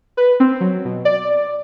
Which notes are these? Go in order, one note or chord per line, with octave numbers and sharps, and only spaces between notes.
B4
C4
F#3
B2
D5